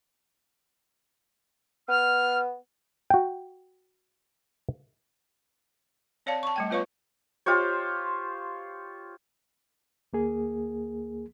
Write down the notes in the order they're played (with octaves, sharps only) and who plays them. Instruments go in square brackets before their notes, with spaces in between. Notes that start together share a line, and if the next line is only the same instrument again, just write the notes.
[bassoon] B3 [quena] F6
[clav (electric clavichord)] F#4 G5
[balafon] C4 C#5 D5 F5 A5
A5 C#6
G3 A3 G5
B3 F4 B4 C#5 F5 C#6
[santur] F4 G4 C5 C#5
[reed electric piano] D2 A#3 G#4